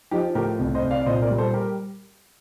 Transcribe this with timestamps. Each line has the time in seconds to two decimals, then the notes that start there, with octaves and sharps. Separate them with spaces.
0.11 F3 D#4 G4
0.35 A2 G4 A#4
0.59 C2
0.75 C5 D#5
0.83 C2
0.91 D5 F5
1.02 D5
1.06 A#2 C5 D#5
1.22 A#4 D5
1.31 G3
1.38 A4 C5
1.54 G4 A#4